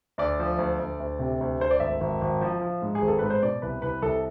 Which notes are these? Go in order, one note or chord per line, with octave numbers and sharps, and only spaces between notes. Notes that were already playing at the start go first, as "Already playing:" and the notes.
D2 D5
F3
D2
D2
D2
C3
D2
D2 C5
D5
G#1 E5
G#1
G#1
F3
F3
G#2
G#4
G#1
A4
G#2 B4
C5
B2 D5
C2 B4
C2 B4
C2 A4